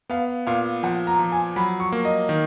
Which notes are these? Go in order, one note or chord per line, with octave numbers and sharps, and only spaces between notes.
B3 F5
A#2 F5
F3 F#5
A#5
F3
G#5
F#3 B5
C#6
A#3
D#5
D#3